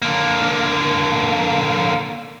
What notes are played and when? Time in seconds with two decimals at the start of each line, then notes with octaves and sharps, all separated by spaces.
0.02 D3 A#3